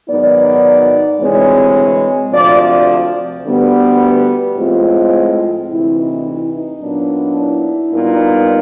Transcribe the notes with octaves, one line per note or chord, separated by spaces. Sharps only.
G#2 D#3 F#3 B3 D#4 D5
D2 C3 E3 G#3 C4 C#5
D2 C3 F3 D5
D5
D2 D3 G3 B3
A2 F3 G#3 C4 F4
D2 C3 E3 E4
D#4
E4
D#4
A#2 F#3 B3 D4
E4
A#2 G3 B3 D#4